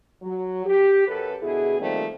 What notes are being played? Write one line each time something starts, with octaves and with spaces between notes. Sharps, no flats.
F#3
G4
F#2 A4 B4
B2 D3 E4 G#4
D#3 F3 G3 A3 A#3 C4